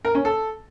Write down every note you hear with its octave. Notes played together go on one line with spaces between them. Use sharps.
A#4
C#4
A4